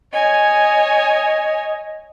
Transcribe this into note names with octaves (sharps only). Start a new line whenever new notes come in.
C#5 D#5 G#5